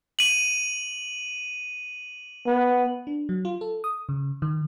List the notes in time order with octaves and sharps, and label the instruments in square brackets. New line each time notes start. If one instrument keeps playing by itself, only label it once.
[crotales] D#7 F#7
[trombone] B3
[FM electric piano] D4
F#3
F4
A4
D#6
C#3
D#3